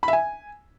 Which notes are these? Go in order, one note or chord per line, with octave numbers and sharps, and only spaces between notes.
B5
E5
G#5